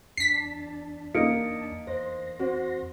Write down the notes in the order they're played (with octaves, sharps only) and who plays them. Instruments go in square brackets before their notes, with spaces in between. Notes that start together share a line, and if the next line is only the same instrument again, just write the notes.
[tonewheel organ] E2 D4 A5 [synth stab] B6 C7
[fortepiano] A#3 D#4 [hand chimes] C#7 D7
[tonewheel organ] E2 C6 A#6 [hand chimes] C5
[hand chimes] C4 F#4 C5